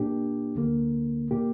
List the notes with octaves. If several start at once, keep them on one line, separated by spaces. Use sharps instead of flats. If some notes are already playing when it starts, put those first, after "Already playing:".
Already playing: A#2 A#3 D4 G4
D2 D3 A#3
A#2 A#3 G4